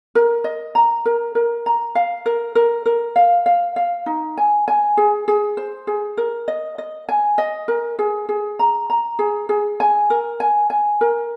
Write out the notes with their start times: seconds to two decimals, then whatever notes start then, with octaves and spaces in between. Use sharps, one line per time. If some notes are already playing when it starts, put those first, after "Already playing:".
0.15 A#4
0.44 D#5
0.75 A#5
1.05 A#4
1.35 A#4
1.66 A#5
1.95 F5
2.26 A#4
2.55 A#4
2.86 A#4
3.16 F5
3.46 F5
3.76 F5
4.06 D#4
4.37 G#5
4.68 G#5
4.97 G#4
5.28 G#4
5.57 C5
5.87 G#4
6.17 A#4
6.48 D#5
6.78 D#5
7.09 G#5
7.38 D#5
7.68 A#4
7.99 G#4
8.29 G#4
8.59 A#5
8.90 A#5
9.19 G#4
9.49 G#4
9.80 G#5
10.10 A#4
10.40 G#5
10.70 G#5
11.01 A#4